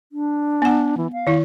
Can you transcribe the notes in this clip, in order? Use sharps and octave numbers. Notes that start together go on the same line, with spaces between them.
D4
B3 F#5
E3
F5
D#3 E4